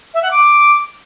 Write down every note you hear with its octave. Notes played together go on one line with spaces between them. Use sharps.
E5
F#5
D6